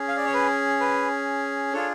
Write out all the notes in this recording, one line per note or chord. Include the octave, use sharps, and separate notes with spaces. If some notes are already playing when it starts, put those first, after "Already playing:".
Already playing: C#4 G#4
F5
D5
C#5
B4
B4
D4 F4 G#4 A4 C#5